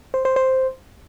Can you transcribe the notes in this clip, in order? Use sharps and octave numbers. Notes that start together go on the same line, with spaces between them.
C5
C5
C5